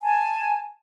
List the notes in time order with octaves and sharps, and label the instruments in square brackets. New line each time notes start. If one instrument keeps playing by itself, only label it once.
[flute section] G#5 A5